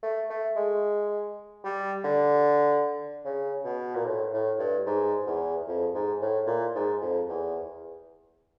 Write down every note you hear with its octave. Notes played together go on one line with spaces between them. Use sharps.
A3
A3
G#3
G3
D3
C#3
B2
A#2
A2
A2
G2
G#2
E2
F2
G#2
A2
A#2
G#2
F2
E2